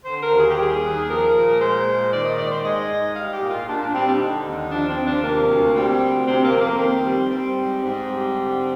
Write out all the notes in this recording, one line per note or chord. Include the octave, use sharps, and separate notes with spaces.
D3 C5
A#4
D#2
G#4
G4
G3 G#4
D#2
F3 A#4
A#2
G#3 C5
A#2
D#3 D5
D#5
G#2 D5
C5
G#3 D#5
G#2
G3 F5
G4
A#2
F4
A#2 D4
D4
G3 C4
D4
D3 D#4
D#2
F3 D4
C4
D#2
D4
C3 A#3
D2
G3 C4
D2
C3 C4
A#3
F2
A#3
D#3 C4
G3
G3 C4
G#2
G#2 C4
G3
D3